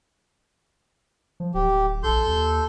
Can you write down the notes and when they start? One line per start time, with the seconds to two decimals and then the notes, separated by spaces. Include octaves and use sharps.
1.40 F3
1.54 D1 G4
2.03 A#1 A4 C6 G6
2.27 D#2